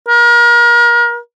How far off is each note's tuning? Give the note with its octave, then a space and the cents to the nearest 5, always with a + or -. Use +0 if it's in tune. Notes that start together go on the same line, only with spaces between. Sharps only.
A#4 +35